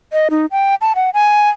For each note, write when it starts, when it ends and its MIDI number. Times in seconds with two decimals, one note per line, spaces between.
0.13 0.28 75
0.30 0.46 63
0.51 0.75 79
0.81 0.92 81
0.95 1.10 78
1.14 1.49 80